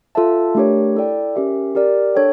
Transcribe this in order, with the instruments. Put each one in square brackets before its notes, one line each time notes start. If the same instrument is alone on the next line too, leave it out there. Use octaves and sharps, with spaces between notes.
[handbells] F4 A4 E5 A5
A3 D4 G4 A#4 C#5
E4 A4 D5 G5
C#4 G4 A#4 E5
G4 A#4 D5
D4 A4 C#5 G5